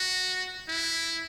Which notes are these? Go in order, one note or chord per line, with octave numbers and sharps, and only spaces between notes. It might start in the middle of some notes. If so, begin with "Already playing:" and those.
Already playing: F#4
E4